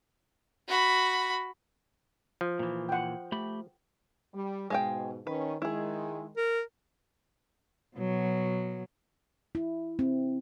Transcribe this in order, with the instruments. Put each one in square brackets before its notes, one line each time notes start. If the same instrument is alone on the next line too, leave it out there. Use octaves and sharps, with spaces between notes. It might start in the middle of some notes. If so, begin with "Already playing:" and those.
[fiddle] F#4 B5
[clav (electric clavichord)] F3
[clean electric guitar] A#2 E3
[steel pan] F#5 G5
[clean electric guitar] A3 G4 B5
[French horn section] G3
[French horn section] G#2 B2 [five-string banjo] G#3 F5 G5
[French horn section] D#3 C#4 [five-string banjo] B4
[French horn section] D#3 G#3 [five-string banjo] E4 G#4
[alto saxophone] A#4
[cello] B2 F#3
[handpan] E4
C4